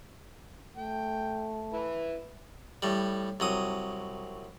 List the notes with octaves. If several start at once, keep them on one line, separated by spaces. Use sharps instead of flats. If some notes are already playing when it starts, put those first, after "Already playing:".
A3 G5
E4 B4
A2 G3
C2 F#3 D#6